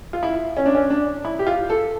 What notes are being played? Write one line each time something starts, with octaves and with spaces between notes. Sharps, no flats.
F4
E4
C#4
D4
C#4
D4
E4
G4
F4
A4